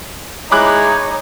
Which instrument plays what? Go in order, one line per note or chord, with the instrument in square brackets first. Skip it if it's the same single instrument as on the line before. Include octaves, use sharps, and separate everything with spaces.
[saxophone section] G#3 E4 [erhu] D#4 [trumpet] C#5 [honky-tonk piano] B5 D6 F#6